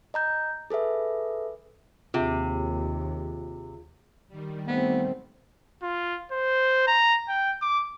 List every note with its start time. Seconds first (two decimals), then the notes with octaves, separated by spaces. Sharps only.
0.14 D#5 A#5 G6
0.70 G#4 A4 B4 E5
2.14 D#2 C3 F4 G#4
4.29 D#3 G3
4.67 A3 B3 C4
5.82 F4
6.32 C5
6.87 A#5
7.28 G5
7.62 D6